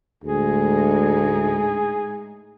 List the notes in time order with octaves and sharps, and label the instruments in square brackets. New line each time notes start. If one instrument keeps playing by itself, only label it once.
[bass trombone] D2 [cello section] A2 G#3 D#4 [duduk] G#4